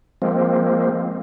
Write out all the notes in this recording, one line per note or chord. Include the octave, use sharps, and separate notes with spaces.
F3 G#3 A#3 C4